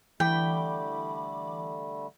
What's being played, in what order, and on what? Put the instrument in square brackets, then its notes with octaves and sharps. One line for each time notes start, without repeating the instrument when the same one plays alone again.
[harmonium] D3 G3 A3 [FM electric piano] E3 B5 D6 [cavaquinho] G5